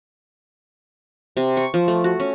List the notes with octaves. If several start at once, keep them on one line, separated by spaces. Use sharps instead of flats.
C3
C#6
F3
A3
F#4
C#4